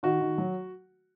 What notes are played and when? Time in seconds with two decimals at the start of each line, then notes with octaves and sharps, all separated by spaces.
0.03 D#3 F#4
0.20 D#3
0.38 F#3